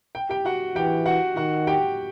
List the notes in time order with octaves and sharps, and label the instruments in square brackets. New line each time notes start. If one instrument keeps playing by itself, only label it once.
[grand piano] G5
G4 G5
F#4 F#5
[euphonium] E3 [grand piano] G4 G5
[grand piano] F#4 F#5
[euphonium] D#3 [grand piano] F#4 F#5
[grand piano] G4 G5